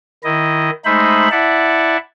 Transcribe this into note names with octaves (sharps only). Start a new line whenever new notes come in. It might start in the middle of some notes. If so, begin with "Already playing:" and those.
D#3 E4 D#5
G#3 A3 D#4 C5 E5 B5
E4 D5 E5 F#5 A5